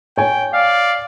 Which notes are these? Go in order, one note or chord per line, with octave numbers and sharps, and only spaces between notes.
C#5 G5 G#5
D5 F5